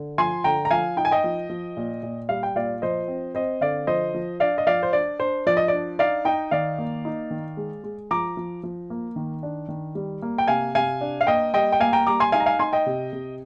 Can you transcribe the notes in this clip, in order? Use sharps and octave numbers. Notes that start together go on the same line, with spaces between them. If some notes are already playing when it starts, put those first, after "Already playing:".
Already playing: D3
F3 G#5 C6
D3 G5 A#5
A#5
F3 F5 G#5
D#4 G5
G#5
D#5 G5
F3
F3
A#2
A#2
G3 F5
G5
A#2 D5 F5
F3 C5 D#5
C4
C4 C5 D#5
D3 D5 F5
F3 C5 D#5
F3
D4 D5 F5
D#5
F3 D5 F5
C5
D4 D5
D4 C5
F3 D5
D#5
D4 D5
D#4 D5 F5
D#4 D#5 G5
D#3 D5 F5
A#3
D#4
D#3
G#3
G#3
F3 A#5 D6
F3
F3
A#3
D#3
D4
D#3
G3
A#3
G5
C3 F5 G#5
C3 F5 G#5
D4
F5
A#3 D#5 G5
G3 D#5 G5
G5
A#3 F5 G#5
G5 A#5
G3 A#5 D6
G#5 C6
D#4 F5 G#5
A#5
F5 G#5
D#4 G#5 C6
D#5 G5
C3
C3